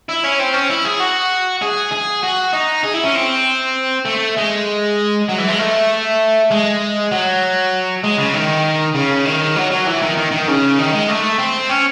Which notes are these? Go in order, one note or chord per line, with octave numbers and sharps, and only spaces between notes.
E4
C#4
C4
C#4
E4
G#4
F#4
G#4
G#4
F#4
D#4
G#4
E4
C#4
C4
A3
G#3
F#3
E3
G#3
A3
G#3
F#3
G#3
C#3
D#3
C#3
D#3
F#3
F#3
E3
D#3
D#3
D#3
C#3
D#3
G#3
A3
C4
C#4